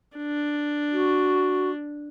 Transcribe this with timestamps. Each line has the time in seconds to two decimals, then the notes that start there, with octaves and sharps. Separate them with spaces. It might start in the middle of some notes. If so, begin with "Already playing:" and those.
0.17 D4
0.92 F#4